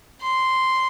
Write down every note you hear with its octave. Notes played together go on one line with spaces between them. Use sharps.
C6